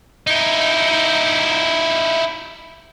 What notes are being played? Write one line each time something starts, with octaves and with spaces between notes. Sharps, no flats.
D#4 E4